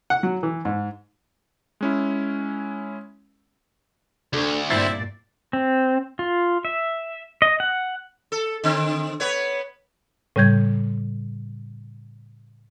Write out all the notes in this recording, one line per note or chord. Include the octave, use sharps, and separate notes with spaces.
F#5
F#3
E3
G#2
G#3 C#4 E4
D2 D3 D4
G2 A#2 C4 E4 D5 A6 B6 C7
C4
F4
E5
D#5
F#5
A4
D3 C4
B3 B4 C#5
A2 C#3 G3 G6 G#6